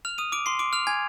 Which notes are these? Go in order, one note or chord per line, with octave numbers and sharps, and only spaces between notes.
F6 F7
D#6 D#7
D6 D7
C6 C7
D6 D7
F6 F7
G#5 G#6